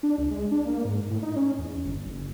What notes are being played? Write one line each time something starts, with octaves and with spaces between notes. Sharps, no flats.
D4
C#2
G#3
D4
A#3
G#2
A2
D#4
C#4
E2
G1
F#1